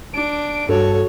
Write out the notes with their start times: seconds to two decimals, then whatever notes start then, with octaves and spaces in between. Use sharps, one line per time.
0.14 D4 D7
0.69 G2 F#4 A4 C#5